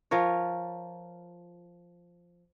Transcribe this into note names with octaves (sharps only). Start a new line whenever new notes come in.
F3 F4 A#4 C#5